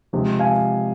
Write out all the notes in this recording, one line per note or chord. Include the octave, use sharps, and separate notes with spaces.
C3 F3 G#3
F5 G#5